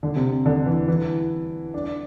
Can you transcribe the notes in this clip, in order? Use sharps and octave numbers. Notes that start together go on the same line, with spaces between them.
D3
C3
D3
E3
E3
D4
D4